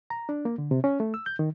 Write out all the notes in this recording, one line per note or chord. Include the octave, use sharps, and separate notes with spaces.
A#5
D4
A#3
D3
C3
C#4
A3
E6
G6
D#3